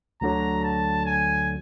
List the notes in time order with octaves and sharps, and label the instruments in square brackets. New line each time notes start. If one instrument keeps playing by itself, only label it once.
[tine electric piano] D2 D3 F#3 [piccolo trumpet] A#5
[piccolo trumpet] A5
G#5